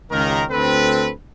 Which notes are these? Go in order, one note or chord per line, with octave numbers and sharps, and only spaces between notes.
C#2 D#3 A#4
D2 C4 A4 B4